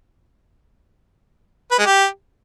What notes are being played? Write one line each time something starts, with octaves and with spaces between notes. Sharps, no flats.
B4
G#3
G4